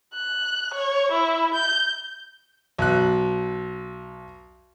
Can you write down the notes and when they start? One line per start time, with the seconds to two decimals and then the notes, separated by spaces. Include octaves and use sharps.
0.14 F#6
0.74 C#5
1.12 E4
1.54 G6
2.78 B1 F#6